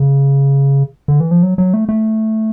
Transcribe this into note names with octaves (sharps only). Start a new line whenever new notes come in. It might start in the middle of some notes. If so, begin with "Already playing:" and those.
Already playing: C#3
D3
E3
F3
F#3
F#3
A3
A3